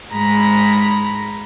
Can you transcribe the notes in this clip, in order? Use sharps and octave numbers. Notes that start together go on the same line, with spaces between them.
G#2 G#3 A#5 B5 A#6